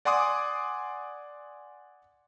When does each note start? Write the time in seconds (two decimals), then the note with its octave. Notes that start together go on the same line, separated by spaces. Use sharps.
0.05 D5 F#5 G#5 C6 D6 D#6